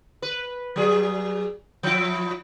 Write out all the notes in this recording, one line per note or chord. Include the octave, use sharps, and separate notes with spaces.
B4
F#3 G#4
F3 E4